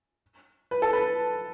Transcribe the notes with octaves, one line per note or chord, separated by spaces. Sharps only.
B4
A4
B4